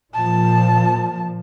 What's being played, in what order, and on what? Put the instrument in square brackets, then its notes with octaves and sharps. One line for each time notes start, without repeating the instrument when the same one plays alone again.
[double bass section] A#2 F3 [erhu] A5